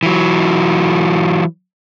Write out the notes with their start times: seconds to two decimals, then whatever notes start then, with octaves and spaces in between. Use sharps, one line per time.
0.03 E3 F#3